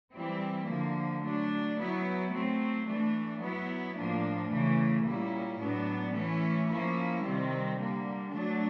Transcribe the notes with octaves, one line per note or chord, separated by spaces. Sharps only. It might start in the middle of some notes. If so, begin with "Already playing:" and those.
E3 G3 C4 E4
D3 F3 A#3
F#3 A3 D4
F#3 B3 E4
F#3 A3 C4
E3 A3 D4
F#3 B3 E4
A2 F3 A#3 D4
C#3 E3 A3
A#2 G3 A#3 C#4 E4
A2 F#3 B3 D4
E3 A3 C#4 E4
F3 A#3 C#4 E4
C3 D#3 G3 C4
D3 G3 A#3
F#3 A3 D4